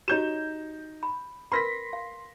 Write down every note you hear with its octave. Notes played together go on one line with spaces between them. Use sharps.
D#4 F#4 G4 C#5 G6 E7
B5
A#4 B4 B5 C6 A#6 B6
F5